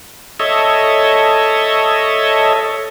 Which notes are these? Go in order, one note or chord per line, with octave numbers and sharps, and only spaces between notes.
A4 C#5 D#5 E5